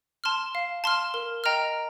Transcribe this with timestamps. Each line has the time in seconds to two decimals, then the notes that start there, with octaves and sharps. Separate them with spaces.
0.24 A5 C6 F6
0.55 F5
0.84 A5 C6 F6
1.14 A#4
1.44 D#5 G5 A#5 F6